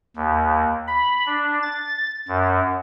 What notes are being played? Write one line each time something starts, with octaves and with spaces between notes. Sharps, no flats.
D#2
B5
D4
A6
F#2